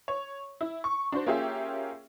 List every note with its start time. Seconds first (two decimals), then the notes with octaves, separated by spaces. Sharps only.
0.08 C#5
0.61 E4
0.84 C#6
1.12 D4 F#4 C5
1.26 A#3 C#4 F4 G4 G#4 E5